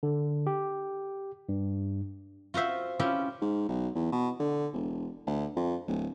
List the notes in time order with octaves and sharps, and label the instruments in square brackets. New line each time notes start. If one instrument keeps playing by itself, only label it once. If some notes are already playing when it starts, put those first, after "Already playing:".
[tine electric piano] D3
G4
G2
[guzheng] F4 F#4 C5 E5
C#4 E4 F4 G4
[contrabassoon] G#2
B1
E2
B2
D3
E1
D2
F2
D1